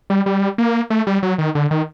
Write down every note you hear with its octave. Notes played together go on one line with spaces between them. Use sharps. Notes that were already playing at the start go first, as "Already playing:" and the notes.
G3
G3
A#3
A3
G3
F#3
D#3
D3
D#3